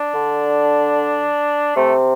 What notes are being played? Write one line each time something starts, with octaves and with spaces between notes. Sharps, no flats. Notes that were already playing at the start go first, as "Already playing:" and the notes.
Already playing: D4
D3
C3 A3